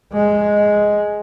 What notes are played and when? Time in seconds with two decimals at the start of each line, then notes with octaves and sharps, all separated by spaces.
0.13 G#3